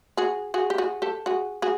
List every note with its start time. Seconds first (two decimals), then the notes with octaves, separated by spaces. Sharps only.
0.17 F#4 G#4
0.54 F#4 G#4
0.70 G4
0.78 F#4 G#4
1.02 G4 A4
1.26 F#4 G#4
1.62 F#4 G#4